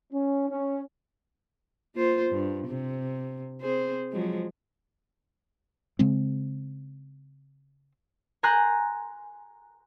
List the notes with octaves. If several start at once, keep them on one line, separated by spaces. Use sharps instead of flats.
C#4
C#4
A#3 F4 C5
G2
C3
C4 G#4 C5
F3 F#3 G#3
C#3 G#3 C4
G#5 A#5 C6 F#6 G6